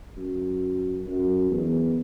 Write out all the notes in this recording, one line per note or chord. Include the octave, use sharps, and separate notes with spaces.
F#2
F#2
E2